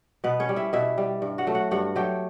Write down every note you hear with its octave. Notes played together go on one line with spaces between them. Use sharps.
B2 B3 B4
C#4 C#5
G3
E4 E5
B2 E4 E5
G3
G2
F#4 F#5
F#3 A3
F#4 F#5
G2 F#4 F#5
F#3 A3 G4 G5